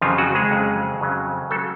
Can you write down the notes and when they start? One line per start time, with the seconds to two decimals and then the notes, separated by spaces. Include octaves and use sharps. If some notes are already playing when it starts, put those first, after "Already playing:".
0.01 F2 C#3 F3 F#3 F4
0.18 F#3 F#4
0.35 G#3 G#4
0.51 F2 C#3 F#3
1.01 F2 C#3 F#3
1.51 C#3 F#3 A3 A4